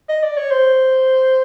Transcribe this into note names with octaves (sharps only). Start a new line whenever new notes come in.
D#5
D5
C#5
C5